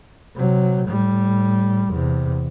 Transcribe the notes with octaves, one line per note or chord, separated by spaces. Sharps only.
C3 F#3
A2 G3
E2 C3